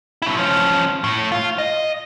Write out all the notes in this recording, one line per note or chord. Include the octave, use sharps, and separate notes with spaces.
F#3 E4
F3 C#4
A2
F4
D#5